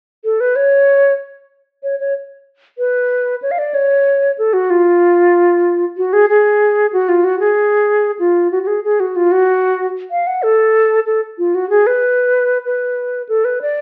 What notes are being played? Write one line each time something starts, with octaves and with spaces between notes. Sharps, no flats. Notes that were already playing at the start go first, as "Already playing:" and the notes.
A4
B4
C#5
C#5
C#5
B4
C#5
F5
D5
C#5
A4
F#4
F4
F#4
G#4
G#4
F#4
F4
F#4
G#4
F4
F#4
F#4
G#4
G#4
F#4
F4
F#4
F5
F#5
A4
A4
F4
F#4
G#4
B4
B4
A4
B4
D5